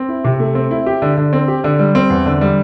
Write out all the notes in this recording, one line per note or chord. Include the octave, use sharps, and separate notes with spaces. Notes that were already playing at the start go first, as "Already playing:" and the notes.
Already playing: C4
E4
C3
A3
C4
E4
G4
D3
D3
C4
G4
D3
G3
C4
E2
D3
G3